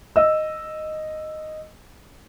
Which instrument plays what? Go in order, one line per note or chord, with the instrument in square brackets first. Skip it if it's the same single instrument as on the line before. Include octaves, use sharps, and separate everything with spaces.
[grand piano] D#5 E6